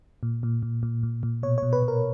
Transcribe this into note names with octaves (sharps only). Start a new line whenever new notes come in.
A#2
A#2
A#2
A#2
A#2
A#2
B2 C#5
B2 C#5
B4
B2
A#4